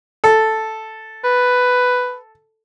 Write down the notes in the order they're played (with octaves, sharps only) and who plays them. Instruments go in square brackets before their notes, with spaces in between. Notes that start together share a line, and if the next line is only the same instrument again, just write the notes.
[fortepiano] A4
[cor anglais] B4